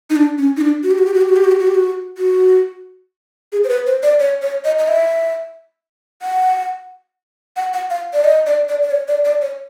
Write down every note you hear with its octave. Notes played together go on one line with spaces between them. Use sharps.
D#4
D4
C#4
D#4
D4
F#4
G4
F#4
G4
F#4
G4
F#4
G4
F#4
G4
F#4
G4
F#4
F#4
G#4
C5
B4
C5
D5
C#5
C#5
D#5
D#5
E5
F#5
F#5
F#5
F5
D5
D#5
D5
D5
D5
C#5
D5
D5
C#5